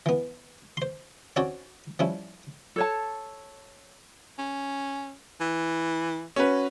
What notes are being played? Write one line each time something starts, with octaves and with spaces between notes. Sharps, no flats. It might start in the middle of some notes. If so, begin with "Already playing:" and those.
E3 B3
C5 C6
C4 C#4 D#4 F#4 C#5 D5
F3 G3 C#4 E4
A4 C#5 A5
C#4
E3
C#4 F#4 B4